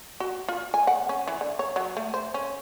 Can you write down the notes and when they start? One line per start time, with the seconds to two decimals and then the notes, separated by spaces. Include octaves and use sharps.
0.20 F#4
0.49 F4
0.74 G#5
0.87 F#5
1.09 C#4
1.28 E3
1.41 D3
1.59 C#5
1.76 F#3
1.97 A3
2.14 C5
2.34 C#4